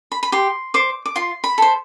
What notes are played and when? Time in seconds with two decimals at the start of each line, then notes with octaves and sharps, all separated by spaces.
0.12 B5
0.23 B5
0.32 G4 C6
0.74 C5 D6
1.06 D6
1.16 F4 C6
1.44 B5
1.58 A4 C5